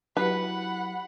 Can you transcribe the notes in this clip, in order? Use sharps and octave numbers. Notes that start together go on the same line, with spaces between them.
F#3 E4 G4 B4 F#5 B5